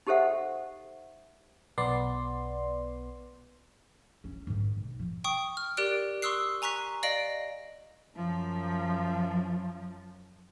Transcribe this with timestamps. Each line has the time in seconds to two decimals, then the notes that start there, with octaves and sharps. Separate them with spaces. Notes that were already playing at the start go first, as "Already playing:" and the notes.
0.07 D#4 G4 A4 C5 E5 F#5
1.78 B1 B3 D5 C6
4.24 C#4 E4
4.47 G#2 D#3
4.77 B1
4.99 F3
5.24 G5 C#6 D#6
5.57 F6
5.77 G4 A#4 D5 F#6 D7
6.22 C6 C#6 D#6 E6 F#6 C7
6.62 G#5 A#5 C#6 F#6 B6
7.03 D5 D#5 F5 A#6 D7 F#7
8.16 F#2 F3